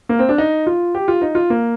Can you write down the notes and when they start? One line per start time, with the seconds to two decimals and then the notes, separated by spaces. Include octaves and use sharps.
0.09 A#3
0.19 C4
0.29 D4
0.38 D#4
0.67 F4
0.95 G4
1.08 F4
1.22 D#4
1.35 F4
1.50 A#3